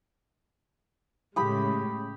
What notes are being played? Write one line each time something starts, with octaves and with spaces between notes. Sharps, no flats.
A2 C#3 G#3 G4 B5 D#6